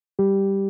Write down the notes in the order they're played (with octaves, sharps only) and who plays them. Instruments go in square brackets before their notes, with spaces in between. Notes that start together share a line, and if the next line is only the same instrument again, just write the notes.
[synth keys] G3 G4